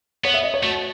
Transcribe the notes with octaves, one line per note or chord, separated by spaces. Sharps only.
B3 C#5
E5
D#5
C#5
A3 F#4